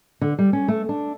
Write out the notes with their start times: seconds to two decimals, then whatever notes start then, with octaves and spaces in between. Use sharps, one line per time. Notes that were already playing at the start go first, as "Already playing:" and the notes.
0.21 D3
0.39 G3
0.53 C#4
0.68 A3
0.89 D4